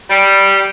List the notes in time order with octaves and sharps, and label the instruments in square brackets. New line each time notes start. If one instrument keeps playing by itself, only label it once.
[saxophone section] G3